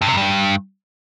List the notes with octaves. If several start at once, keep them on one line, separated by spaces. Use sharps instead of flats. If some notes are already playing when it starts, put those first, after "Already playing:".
G2
C3
F#2
G2